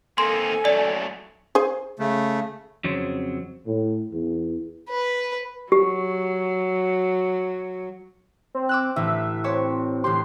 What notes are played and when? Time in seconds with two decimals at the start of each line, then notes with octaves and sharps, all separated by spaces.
0.18 A#3 C4 D#4 A4 G#5 C6
0.65 F#2 F#3 A3 D5
1.55 G#4 C5 G#5
1.99 C#3 A3
2.84 F2 C#3 F#3 C4
3.66 A2
4.11 E2
4.89 B4
5.72 F#3 G4
8.55 C4
8.69 D6 E6 F#6
8.96 A1 E5
9.44 C4 C#5 D5 E5
10.04 A1 G4 C6